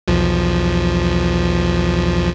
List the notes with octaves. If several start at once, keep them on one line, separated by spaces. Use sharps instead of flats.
B1 E2 F3